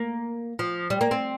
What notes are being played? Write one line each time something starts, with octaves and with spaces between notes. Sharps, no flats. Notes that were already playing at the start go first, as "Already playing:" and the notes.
Already playing: A#3
F3
G3
A#3
C4